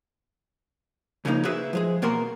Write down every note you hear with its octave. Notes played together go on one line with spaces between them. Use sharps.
C#2 C#3 F3 A#3 B3 D#4
E4 F#4 G#4 B4 E5
F3 G#3 G#4
E2 B2 A#3 F#4 A#4 C6